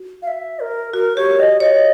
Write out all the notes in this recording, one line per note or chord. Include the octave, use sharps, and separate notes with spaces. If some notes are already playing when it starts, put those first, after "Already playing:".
Already playing: F#4
F5
E5
A#4
F#4 A#4
G4 C#5
D#5
C#5 D#5